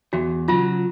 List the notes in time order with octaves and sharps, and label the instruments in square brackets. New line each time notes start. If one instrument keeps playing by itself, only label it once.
[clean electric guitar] E2 [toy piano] F#4
[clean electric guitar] C#3 F#3 [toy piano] F4